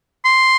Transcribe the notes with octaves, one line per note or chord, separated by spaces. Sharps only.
C6